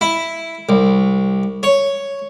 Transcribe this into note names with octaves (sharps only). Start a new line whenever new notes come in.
E4
C2
C#5